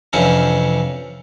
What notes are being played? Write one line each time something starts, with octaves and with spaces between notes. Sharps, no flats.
F2 C3 E3 C#4 D4